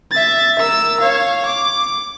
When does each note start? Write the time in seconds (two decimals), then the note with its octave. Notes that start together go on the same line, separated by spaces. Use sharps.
0.11 E5 A6
0.59 A#4 E6
1.00 C#5 F5
1.46 D6